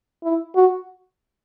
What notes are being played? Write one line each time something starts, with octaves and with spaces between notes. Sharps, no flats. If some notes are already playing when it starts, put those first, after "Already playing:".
E4
F#4